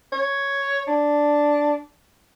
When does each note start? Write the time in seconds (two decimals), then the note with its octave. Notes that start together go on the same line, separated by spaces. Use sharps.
0.13 C#5
0.87 D4